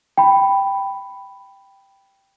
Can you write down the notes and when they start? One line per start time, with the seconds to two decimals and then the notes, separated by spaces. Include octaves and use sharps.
0.17 G5 B5